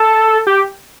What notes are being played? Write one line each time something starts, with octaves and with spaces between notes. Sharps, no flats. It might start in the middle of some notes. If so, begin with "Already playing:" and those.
Already playing: A4
G4